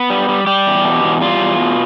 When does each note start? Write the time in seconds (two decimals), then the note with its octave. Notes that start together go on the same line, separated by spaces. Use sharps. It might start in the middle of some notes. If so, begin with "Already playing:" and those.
Already playing: B3
0.10 G3
0.29 G3
0.47 G3 G4
0.66 E2
0.85 B2
1.04 E2
1.21 G3 F4
1.40 E2
1.59 B2